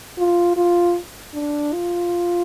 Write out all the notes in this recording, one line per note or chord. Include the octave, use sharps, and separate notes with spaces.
F4
F4
D4
F4